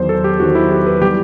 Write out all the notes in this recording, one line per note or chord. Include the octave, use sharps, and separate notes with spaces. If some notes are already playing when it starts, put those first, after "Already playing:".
Already playing: E2 D#3 F#3 C5
A4
G4
E2 D#3 F#3 F#4
E4
G4
B4
E3 G3 B3 G4